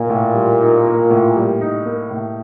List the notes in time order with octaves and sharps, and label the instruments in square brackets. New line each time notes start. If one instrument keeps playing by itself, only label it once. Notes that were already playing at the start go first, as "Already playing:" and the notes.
Already playing: [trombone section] A#2 [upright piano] A#3 D#4
[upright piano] A2
G3
D#4
A#3
A2
G3
D#4
A#3
A2